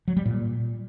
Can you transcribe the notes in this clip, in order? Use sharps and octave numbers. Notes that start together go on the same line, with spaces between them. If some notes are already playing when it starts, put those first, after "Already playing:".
F#3
G3
A#2